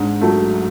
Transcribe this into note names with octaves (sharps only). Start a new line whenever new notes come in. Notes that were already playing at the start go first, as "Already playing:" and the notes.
Already playing: G#2 D4
F#3 A3